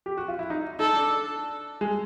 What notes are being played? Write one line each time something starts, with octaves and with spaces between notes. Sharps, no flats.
G4
F#4
F4
E4
D#4
D#4 A4
D4
G#3